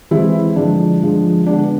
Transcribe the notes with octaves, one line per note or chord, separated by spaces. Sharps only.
E3 G#3 C4 E4
D3 F3 G#3 D4
D3 F3 G#3
D3 G#3 B3 D4